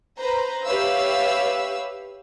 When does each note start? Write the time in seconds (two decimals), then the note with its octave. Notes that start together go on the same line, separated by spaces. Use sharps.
0.18 B4 C5 A#5
0.65 G4 B4 C#5 E5 F5 E6